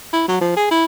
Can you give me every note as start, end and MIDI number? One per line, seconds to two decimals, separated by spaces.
0.13 0.24 64
0.28 0.37 54
0.41 0.53 53
0.56 0.67 68
0.71 0.85 64